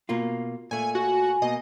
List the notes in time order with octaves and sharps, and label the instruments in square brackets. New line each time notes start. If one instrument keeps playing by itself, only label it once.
[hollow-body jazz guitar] B2 A#3 F4
[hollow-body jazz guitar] A#2 A3 [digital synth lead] G#5
[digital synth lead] F#4 [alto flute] G#5
[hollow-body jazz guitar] B2 A#3 [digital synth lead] D#5